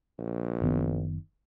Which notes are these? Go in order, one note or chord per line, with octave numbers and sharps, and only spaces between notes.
A#1
F#1 D#3 B3